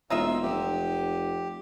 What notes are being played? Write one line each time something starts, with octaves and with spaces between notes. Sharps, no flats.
E1 A#2 D#4 F4 E5 E6
F1 G4